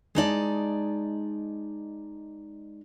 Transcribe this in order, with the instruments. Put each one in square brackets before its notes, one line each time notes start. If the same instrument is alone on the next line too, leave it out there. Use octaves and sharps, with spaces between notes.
[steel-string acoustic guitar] G#3 D#4 D5 A5